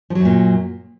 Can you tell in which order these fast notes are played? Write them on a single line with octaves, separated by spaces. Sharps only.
F3 F#3 F#2 A#2